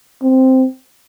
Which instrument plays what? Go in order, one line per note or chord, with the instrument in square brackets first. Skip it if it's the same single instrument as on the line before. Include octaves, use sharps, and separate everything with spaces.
[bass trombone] C4